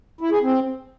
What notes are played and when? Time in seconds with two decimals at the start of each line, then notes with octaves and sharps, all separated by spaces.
0.21 E4
0.31 G#4
0.42 C4